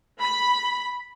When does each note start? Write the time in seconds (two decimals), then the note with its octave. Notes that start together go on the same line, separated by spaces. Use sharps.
0.19 B5